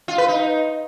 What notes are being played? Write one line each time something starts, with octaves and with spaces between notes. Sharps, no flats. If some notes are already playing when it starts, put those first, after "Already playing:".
F4
B4
D#4